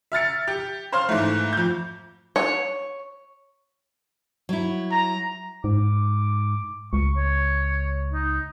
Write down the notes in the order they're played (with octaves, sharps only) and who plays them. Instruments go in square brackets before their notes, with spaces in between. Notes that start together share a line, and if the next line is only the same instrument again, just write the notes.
[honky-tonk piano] E5 F6 A6 C#7
G4
C5 C#5 F5 C6 F6
G#2 E3 A3
F2 G6
[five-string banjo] C#5
[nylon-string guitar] F#3 E4
[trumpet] A#5
[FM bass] G#2 [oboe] D6
[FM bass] C#2 [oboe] C#6
[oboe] C#5
D#4